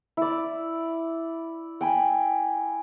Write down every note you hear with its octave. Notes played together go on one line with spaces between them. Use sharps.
E4 D5
G5 G#5 B5